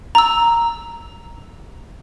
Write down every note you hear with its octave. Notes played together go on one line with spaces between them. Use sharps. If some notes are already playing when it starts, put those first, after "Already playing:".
A#5 E6